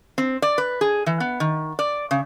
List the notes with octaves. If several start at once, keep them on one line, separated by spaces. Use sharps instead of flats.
C4
D5
B4
G#4
E3
B3
D#3
D5
C#3